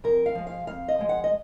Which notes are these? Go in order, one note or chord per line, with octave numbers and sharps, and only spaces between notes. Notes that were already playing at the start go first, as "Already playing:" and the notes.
F2 A#4
F5
F3 G#3
F5
F2 F5
D#5
F3 G#3
F#5
D#5